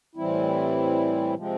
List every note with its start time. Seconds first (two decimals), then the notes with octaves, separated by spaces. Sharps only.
0.15 A2 E3 G3 C4 E4
1.34 C3 F3 G#3 C4